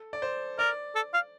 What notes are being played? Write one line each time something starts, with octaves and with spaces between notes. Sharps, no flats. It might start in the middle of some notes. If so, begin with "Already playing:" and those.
Already playing: A4
D5
C5
A#4 D5
A4
F5